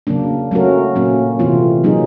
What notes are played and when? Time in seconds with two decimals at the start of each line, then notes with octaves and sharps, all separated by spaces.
0.07 C#3 F#3 A#3 D4
0.51 F#3 A3 C#4 F#4 A#4
0.95 A#2 F#3 A#3 C#4
1.39 C3 E3 A3 C4 F4
1.84 F#3 A#3 D#4 G#4